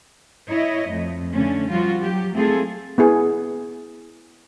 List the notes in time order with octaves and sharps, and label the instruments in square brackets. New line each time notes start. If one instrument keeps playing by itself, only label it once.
[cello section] E4 C#5 D#5
F2 A3
D3 A3 C#4
F3 G3 F4 F#4
F#3 G4
A3 C4 E4 F4 G#4 A4
[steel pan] B3 E4 G#4